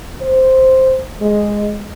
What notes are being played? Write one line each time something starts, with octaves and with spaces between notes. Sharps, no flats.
C5
G#3